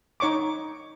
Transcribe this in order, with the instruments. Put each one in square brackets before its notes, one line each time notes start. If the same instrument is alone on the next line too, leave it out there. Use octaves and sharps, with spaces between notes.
[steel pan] D#4 C#5 C#6 D6